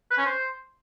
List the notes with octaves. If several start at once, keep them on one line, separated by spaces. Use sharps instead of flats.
B4
C#4
C5